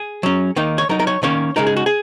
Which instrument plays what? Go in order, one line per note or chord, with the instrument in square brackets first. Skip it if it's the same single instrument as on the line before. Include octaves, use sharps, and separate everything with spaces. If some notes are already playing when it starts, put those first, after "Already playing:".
Already playing: [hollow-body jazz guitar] G#4
F#3 C#4
D#3 A#3 D#4
C#5
F#3 D#4 A#4
A#4
C#5
D#3 A#3 C#4 C#5
C#3 G#3 D#4 A#4
G#4
F#4
G#4